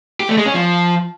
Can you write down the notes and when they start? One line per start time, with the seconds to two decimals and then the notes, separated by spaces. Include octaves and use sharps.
0.20 G4
0.29 A3
0.37 G#3
0.46 C#4
0.55 F3